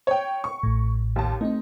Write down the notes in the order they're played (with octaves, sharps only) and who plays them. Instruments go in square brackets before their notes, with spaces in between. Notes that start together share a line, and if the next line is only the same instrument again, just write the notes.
[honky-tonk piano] C#5 G5
C#6
[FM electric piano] A1 A2
[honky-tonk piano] D#2 A5
[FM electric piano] A3 C4 [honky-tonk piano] D#4